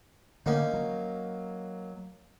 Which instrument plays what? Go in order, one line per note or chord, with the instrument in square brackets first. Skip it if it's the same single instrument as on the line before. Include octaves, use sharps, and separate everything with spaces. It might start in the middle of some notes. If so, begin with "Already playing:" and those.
[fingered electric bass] D3 [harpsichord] A#3 C#4 D#4
[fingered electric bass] F#3